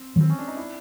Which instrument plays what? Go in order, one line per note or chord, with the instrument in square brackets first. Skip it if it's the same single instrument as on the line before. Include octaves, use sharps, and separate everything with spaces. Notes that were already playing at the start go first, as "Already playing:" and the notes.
Already playing: [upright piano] C4
[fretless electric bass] D#3 F#3 [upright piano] C4
[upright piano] C#4
D4
D#4
D4 E4